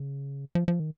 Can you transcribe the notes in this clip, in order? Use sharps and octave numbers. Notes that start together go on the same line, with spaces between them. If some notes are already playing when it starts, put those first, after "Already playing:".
Already playing: C#3
F3
F3
D#3